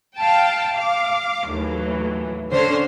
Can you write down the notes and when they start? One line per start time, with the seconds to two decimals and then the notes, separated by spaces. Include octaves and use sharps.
0.17 F5 G5 A5
0.76 F5 D6
1.47 D#2 A2 E3 F#3
2.51 D3 C#4 D4 C5 C#5 C7